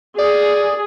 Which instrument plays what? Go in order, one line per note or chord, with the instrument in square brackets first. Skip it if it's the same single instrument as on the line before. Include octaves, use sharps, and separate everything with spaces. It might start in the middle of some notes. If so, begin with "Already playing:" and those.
[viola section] G#4 [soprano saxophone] D5